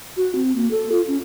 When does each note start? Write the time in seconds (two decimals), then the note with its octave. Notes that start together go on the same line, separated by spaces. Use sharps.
0.17 F#4
0.35 C4
0.55 A#3
0.71 A4
0.92 F4
1.07 C#4